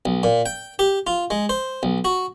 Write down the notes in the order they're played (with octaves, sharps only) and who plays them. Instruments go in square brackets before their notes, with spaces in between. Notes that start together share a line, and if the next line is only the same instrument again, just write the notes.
[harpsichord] B1
A#2
G5
G4
F4
G#3
C5
B1
F#4